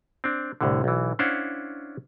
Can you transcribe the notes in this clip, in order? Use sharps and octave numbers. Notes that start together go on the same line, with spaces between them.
C4 D4
C2 A2 D3
B1 E3
C#4 D4 E4 C5 F5 F#5